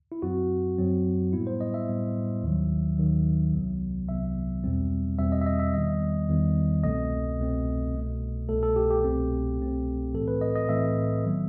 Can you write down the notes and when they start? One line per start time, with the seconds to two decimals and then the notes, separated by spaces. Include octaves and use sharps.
0.12 E4
0.22 F#2 F#3 C4 F#4
0.78 F#2 F#3 C4
1.33 A2 G3 B3 E4
1.47 C5
1.61 D#5
1.74 E5
1.88 A2 G3 B3
2.43 D#2 D#3 F#3
2.98 D#2 D#3 F#3
3.53 C2 C3 F#3 B3
4.08 C2 C3 F#3 B3 E5
4.64 E2 B2 G3 C4
5.18 E2 B2 G3 C4 E5
5.32 D#5
5.42 E5
5.46 D#5
5.60 E5
5.74 E2 D#3 G3 B3 D#5
6.29 E2 D#3 G3 B3
6.83 C2 B2 A3 C4 D#5
7.39 C2 B2 A3 C4
7.94 C2 B2 A3
8.49 C2 B2 A3 A4
8.63 A4
8.76 G4
8.90 G4
9.04 C2 B2 A3 C4
9.60 C2 B2 A3 C4
10.14 A2 E3 A3 C4 A4
10.28 B4
10.41 D#5
10.56 D#5
10.69 A2 E3 A3 C4 E5
11.25 D#3 F#3 B3